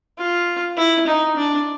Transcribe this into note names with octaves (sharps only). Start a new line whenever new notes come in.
F4
E4
D#4
D4